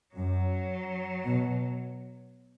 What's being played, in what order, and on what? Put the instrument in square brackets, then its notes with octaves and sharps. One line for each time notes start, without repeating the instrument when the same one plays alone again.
[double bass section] F#2 [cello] F#3
[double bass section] B2